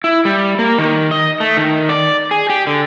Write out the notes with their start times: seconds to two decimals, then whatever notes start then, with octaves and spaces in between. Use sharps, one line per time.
0.04 E4
0.25 G3
0.59 A#3
0.79 D#3
1.11 D#5
1.40 A3
1.57 D#3
1.89 D5
2.31 G#4
2.50 G4
2.67 D3